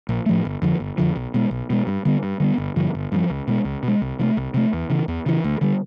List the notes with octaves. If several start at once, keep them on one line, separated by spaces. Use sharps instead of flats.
A#1
A2 F3 A3
G1
F2 D3 F3
G1
F2 D3 F3
B1
B2 G#3
B1
B2 G#3
G2
D3 G3 B3
G2
D3 G3 B3
G1
G2 D3 F3
G1
G2 D3 F3
C#2
B2 G#3
C#2
B2
G#3
C2
C3 E3 A3
C2
C3 E3 A3
E2
C#3 E3
E2
C#3 E3
D2
D3 G3